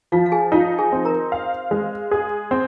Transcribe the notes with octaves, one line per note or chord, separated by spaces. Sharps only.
F3 F4 F5
F5
G#4 G#5
D#4 F4 F5
G#4 G#5
C4
A#4 A#5
F5
G#3
G#4
C4